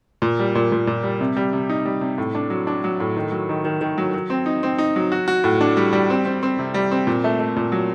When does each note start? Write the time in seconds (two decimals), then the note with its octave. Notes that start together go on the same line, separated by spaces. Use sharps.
0.22 A#2
0.39 G3
0.55 A#2
0.72 A#2
0.87 A#2
1.03 G3
1.21 C3
1.37 G3
1.53 C3
1.69 D#4
1.85 G3
2.01 C3
2.18 A2
2.35 D4
2.50 F#3
2.67 D4
2.84 F#3
3.00 A2
3.16 D#3
3.32 F#3
3.49 D#3
3.65 D#3
3.81 D#3
3.98 F#3
4.14 F#3
4.30 C4
4.46 D#4
4.63 C4
4.78 D#4
4.96 F#3
5.12 F#4
5.28 F#4
5.44 A2
5.61 D4
5.77 G3
5.93 G3
6.10 C4
6.25 C4
6.43 C4
6.59 C3
6.74 G3
6.91 C4
7.07 A#2
7.24 A3
7.40 A3
7.56 A#2
7.72 F#3